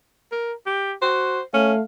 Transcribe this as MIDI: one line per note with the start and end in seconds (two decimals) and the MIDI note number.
0.32 0.53 70
0.67 0.94 67
1.02 1.40 66
1.02 1.41 72
1.54 1.81 57
1.54 1.73 61
1.54 1.82 77